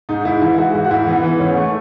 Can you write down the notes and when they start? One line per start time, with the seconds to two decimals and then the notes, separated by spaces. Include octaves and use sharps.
0.09 G#2 D#4
0.25 G#2 E4
0.41 E3 E4
0.58 G#3 F#4
0.74 G#2 F#4
0.84 F#4
0.91 G#2 E4
1.07 E3 B3
1.23 E3 B3
1.40 G#2 C#4
1.56 A3